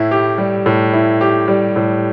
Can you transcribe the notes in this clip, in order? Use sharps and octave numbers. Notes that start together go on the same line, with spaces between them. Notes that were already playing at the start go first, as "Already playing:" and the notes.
Already playing: A2 E4
G4
G3
A2
E4
G4
G3
A2